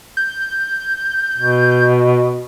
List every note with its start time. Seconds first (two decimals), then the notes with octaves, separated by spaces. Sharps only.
0.17 G6
1.37 B2